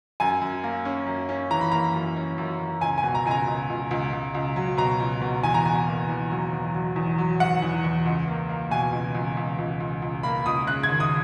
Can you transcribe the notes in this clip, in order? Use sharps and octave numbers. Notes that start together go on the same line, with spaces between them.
F#2 G#5
F#2
A#3
C#4
F#2
C#4
E3 A#5
B5
A#3 A#5
F#2
C#4
F#2
F#2
C#2 G#5
G#5
B2
A#5
C#2 G#5
A#5
C#2
C#2
C#2
C#2
C#2
F#3
B2 A#5
C#2
B2
E2 G#5
A#5
B2 G#5
A#3
E2
F#3
E2
F#3
E2
F#3
F#3 F#5
E2
E2
C#2
A#3
A#3
B2 G#5
C#2
C#2
C#2
C#2
C#2
C#2
A#3 B5
C#2 D#6
C#3 F#6
G#6
D#2
D#6